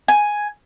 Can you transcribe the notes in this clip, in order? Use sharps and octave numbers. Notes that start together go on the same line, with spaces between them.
G#5